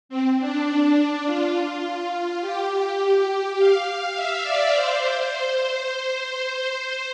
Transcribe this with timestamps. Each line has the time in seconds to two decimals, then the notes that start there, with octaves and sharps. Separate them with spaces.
0.09 C4
0.39 D4
0.68 D4
1.26 F4
2.41 G4
3.57 F5
4.14 E5
4.43 D5
4.73 C5